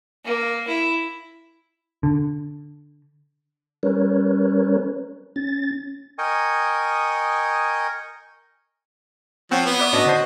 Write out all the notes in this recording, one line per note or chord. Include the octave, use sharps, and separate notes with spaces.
A#3
E4
D3
G3 C#4 A#4 B4 C#5
C#4 A6
A#4 D#5 G5 G#5 C#6 D#6
F3 C4 C5 C#5 F#5
B3
B4 D5 E5
A2 C#4 D4 F#4 D#5
D3 D4 C5